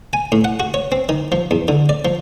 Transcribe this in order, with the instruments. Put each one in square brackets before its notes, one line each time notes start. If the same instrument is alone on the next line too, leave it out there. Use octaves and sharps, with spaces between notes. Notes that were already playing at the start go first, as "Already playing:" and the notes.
[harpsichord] G#5
A2
F#5
F#4
C#5
C4
D#3
F3
E2
D3
D5
F3